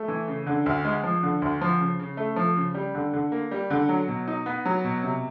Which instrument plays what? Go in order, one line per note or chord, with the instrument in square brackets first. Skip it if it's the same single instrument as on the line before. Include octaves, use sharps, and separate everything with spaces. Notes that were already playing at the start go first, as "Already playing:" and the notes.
Already playing: [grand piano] A3
E3
C#3
D3
D2
G#3
F3
D3
D2
F3
C#3
C#3
A3
F3
C#3
G3
D3
D3
A#3
G3
D3
F#3
B2
D#4
B3
F#3
B2
C3